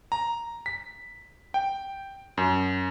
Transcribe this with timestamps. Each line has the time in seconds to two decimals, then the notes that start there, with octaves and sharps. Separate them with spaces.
0.12 A#5
0.66 B6
1.54 G5
2.37 F#2